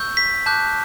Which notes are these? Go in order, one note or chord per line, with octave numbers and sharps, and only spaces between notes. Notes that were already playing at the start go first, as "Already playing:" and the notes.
Already playing: C#6 E6 G6
B6
A5 D6 F#6 G6